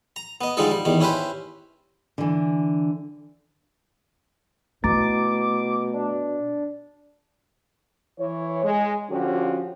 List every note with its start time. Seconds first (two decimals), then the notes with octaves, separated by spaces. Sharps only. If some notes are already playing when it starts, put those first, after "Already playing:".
0.16 A#5
0.41 B3 D#5
0.57 D3 F3 G3 G#3 D#4 A4
0.71 G3
0.85 E2 D#3 G3
1.01 C#4 E4 G4 B4 C5
2.18 D3 E3
4.84 B2 A3 B3 E4 A#5 D6 A6
5.94 D4
8.19 E3 C#5
8.64 G#3
9.10 D3 F3 C#4 F#4 G4